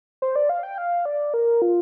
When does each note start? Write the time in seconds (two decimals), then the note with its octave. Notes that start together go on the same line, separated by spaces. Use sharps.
0.22 C5
0.36 D5
0.49 F5
0.63 G5
0.78 F5
1.05 D5
1.34 A#4
1.62 F4